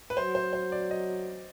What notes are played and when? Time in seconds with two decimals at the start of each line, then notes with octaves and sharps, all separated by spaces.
0.10 B4
0.17 F#3 C5
0.35 C5
0.53 C5
0.72 D5
0.91 D#5